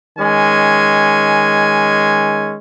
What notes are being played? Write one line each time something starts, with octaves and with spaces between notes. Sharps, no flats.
D#3 G#3 C#4 G#5